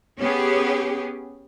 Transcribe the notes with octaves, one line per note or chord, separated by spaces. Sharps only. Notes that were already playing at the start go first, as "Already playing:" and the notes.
B3 C#4 G4 G#4